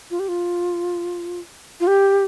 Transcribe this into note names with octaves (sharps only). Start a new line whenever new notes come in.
F4
G4
F4
F4
G4